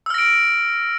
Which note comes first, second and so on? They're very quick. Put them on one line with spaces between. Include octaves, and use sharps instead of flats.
E6 F6 A#6 D7